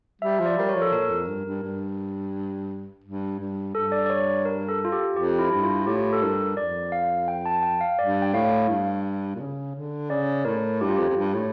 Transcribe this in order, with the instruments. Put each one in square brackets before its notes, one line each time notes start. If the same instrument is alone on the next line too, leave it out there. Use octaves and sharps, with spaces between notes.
[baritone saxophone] G3 [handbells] E5
[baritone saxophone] F3
[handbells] D5
[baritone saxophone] G3 [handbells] A#4
[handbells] C#5
[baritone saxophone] F3
[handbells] A4
[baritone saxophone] A#2 [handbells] A#4
[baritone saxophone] F2
G2
G2
G2
G2
G2
[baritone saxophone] G2 [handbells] A4
[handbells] D5
D5
C#5
A#4
A4
F4
G4
[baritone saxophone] F2 [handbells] G4
[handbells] E4
[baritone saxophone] G2 [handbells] E4
[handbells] F4
F4
[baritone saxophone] A2 [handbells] G4
[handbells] A4
[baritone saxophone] G2 [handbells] A#4
[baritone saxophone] F2 [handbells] D5
[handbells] F5
G5
A5
G5
F5
[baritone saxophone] G2 [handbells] D5
[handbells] G5
[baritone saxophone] A2 [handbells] F5
[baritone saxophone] G2
A#2
C#3
D3
[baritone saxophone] C#3 [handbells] D5
[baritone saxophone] A2 [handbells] A#4
[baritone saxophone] G2 [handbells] G4
[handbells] F4
[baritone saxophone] F2 [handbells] G4
[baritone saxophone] F2
G2
A2